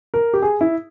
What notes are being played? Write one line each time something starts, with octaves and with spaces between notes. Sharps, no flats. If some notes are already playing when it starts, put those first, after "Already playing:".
A#4
G4
G#4
E4